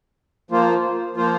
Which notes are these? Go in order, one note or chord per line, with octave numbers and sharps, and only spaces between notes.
F3 A#3 F4 C5
F3 A#3 F4 C5